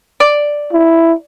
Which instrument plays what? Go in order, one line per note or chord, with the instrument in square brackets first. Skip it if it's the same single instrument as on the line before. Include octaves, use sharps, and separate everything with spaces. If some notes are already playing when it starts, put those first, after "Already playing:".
[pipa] D5
[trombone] E4